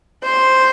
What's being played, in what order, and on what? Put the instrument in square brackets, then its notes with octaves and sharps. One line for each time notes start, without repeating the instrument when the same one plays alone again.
[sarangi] C5